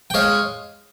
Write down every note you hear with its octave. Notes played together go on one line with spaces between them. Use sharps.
G5
G#3 C#5 F5